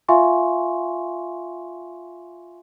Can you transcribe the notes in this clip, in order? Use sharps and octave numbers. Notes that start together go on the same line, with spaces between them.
F4 E5 F5 G#5 C6 C#6